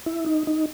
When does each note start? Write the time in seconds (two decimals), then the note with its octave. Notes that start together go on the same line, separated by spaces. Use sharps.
0.06 E4
0.26 D#4
0.47 D#4